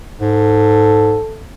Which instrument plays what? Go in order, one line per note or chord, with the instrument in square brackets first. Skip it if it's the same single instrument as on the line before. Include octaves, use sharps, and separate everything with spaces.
[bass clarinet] G#2 [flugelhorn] A4